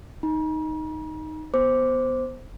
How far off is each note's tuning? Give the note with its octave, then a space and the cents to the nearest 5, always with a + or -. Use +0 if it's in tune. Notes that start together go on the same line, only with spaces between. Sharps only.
D#4 +0 A#5 +45
B3 +0 C5 +0 D6 -5